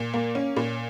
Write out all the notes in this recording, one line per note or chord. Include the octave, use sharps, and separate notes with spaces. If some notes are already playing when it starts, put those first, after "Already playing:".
Already playing: A#2
A#3
C#4
A#2